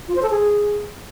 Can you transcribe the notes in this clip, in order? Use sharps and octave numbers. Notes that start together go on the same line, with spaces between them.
F4
C5
A4
G#4